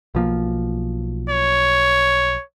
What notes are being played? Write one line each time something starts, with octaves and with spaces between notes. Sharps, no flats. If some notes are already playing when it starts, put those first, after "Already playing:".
B1 F3 A#3
C#5